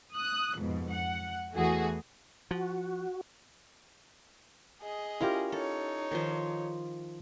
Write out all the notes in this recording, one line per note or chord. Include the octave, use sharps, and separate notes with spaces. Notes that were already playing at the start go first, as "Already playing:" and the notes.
D#6 F#6
F2 G#2 B2
F#5
E2 E3 A3 F#4 G#4
F3 F#4
G#4 D#5
C#4 E4 F4 G4 A#4 A#5
D#4 A4 C#5
D#3 F3 C5